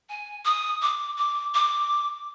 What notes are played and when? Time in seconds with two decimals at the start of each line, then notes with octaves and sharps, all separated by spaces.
0.09 G#5
0.45 D#6
0.82 D6
1.18 D6
1.54 D6